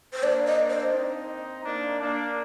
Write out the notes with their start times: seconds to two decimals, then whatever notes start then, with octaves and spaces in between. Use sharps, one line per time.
0.13 C5
0.23 A#3 D4 D5
0.47 D#5
0.70 C5
0.94 C4 D#4
1.65 A#3 D4
2.00 A#3 D4